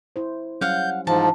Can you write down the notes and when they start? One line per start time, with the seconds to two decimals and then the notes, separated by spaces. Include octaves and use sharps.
0.16 E4 C5
0.61 F#3 G3 C#4 F5 F#5 G6
1.07 G#2 E3 F3 A5